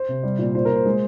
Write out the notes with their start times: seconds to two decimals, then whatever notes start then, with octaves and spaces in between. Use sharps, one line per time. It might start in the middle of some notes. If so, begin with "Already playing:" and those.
Already playing: C5
0.09 C3
0.23 G3
0.38 A#2
0.55 A#2 C5
0.65 A#2 A#4
0.76 C5
0.85 G#3